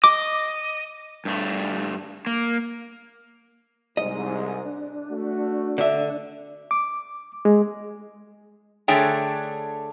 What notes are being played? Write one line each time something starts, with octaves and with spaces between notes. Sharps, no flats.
D#5 D6
G2 A3
A#3
C2 G#2 D#5
D4
A3 F#4
D3 E5
D6
G#3
D3 A3 D4 G#4 C#5 G5